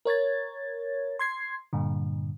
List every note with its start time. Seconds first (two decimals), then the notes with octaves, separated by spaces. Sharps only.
0.05 A#4 C#5 G#6 A6
1.19 C6 G#6 C7
1.73 G2 A#2 D3